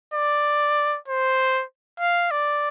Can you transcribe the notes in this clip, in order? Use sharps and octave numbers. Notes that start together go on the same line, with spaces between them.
D5
C5
F5
D5